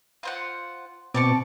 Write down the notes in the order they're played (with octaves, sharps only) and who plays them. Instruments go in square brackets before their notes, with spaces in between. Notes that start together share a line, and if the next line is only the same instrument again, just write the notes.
[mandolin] F4 C5 F#5
[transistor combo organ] B2 C4 [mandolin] D5 A5 C#6